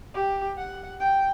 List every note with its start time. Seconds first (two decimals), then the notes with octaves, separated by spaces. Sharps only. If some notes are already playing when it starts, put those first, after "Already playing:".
0.14 G4
0.58 F#5
1.00 G5